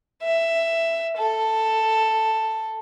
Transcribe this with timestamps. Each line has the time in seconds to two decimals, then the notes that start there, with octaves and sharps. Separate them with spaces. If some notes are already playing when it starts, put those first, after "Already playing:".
0.23 E5
1.17 A4